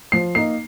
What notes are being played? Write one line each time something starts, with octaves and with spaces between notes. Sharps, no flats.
F3 C7
A#3 D#4 C7